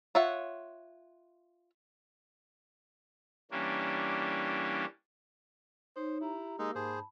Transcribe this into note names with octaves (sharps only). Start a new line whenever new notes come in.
F4 C#5 E5 F#5
E3 G3 A#3 C#4 D4
D#4 C5 C#5
E4 G4 A#5
G#3 A#3 D#4 E6
G#2 G#4 C5 A5 B5